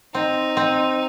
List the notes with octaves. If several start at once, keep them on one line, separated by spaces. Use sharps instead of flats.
C4 D#4
C4